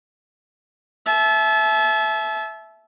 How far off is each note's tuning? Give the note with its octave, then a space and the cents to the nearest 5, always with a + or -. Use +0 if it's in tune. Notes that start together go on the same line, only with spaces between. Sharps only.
E5 +0 A5 -35